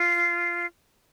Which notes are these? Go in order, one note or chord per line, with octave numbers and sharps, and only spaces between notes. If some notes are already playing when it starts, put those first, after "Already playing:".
Already playing: F4